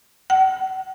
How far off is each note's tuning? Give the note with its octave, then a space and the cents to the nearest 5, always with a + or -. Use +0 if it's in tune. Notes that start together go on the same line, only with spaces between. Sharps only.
F#5 +40